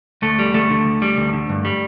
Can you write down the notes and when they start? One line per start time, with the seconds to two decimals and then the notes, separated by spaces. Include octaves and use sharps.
0.22 D2 A3
0.39 G3
0.54 D2 A3
0.70 D3
0.85 D2
1.02 G3
1.17 D2
1.33 D3
1.49 G2
1.65 G3